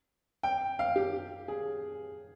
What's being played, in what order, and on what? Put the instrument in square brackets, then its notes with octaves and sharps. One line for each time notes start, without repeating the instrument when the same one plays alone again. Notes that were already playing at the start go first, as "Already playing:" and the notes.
[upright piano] G5
F5
G4
G#4